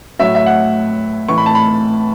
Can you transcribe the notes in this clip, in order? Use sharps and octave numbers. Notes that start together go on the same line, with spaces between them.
A2 F#3 E5
E5
F#5
A2 E3 C#6
B5
A5
B5